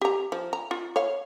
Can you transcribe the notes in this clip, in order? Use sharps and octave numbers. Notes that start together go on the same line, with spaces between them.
G4 A#5
F3
A#5
F4
C#5 F5